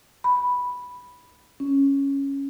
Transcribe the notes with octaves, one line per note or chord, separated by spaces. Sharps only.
B5
C#4